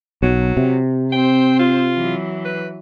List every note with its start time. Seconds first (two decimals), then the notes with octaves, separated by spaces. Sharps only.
0.23 B1 F#3
0.57 C3
1.12 C4 C5 G5
1.59 F4
1.94 E3 F#3
2.45 B4